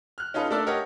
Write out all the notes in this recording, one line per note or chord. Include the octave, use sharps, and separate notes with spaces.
F6 F#6
C#4 D#4 F4 A4 B4
A3 D4 A4 A#4 D5 E5
G4 A#4 C#5 D#5 F#5